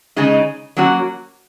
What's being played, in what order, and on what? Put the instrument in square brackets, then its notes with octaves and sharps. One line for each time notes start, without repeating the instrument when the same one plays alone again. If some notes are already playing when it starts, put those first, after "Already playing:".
[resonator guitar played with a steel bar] C#3 G#3 D#4
F#3 A#3 C#4 F#4